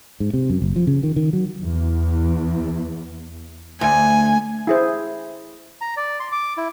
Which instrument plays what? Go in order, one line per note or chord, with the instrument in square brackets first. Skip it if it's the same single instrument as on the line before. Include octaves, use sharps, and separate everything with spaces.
[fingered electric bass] G#2
C3
F#2
F#1
F3
C#3
D#3
D#3
F#3
[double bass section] E2
[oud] D2 [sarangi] G#5
[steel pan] E4 G#4 C5
[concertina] A#5
D5
C6
D6
E4